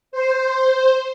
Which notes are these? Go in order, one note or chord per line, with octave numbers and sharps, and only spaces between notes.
C5